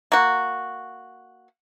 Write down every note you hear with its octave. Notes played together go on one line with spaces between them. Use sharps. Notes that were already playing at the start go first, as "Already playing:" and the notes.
A#3 F#4